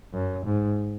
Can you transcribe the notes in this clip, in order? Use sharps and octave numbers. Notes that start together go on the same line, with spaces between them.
F#2
G#2